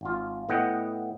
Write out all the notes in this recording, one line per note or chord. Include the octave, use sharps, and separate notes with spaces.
G#1 F4
A2 B3 D#5 F#5 G5